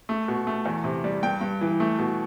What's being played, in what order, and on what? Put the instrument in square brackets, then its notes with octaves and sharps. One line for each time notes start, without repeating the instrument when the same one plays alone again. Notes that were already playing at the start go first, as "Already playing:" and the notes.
[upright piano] A3
B2
A3
E2
C3
G3
G2 G5
G2
E3
A3
B2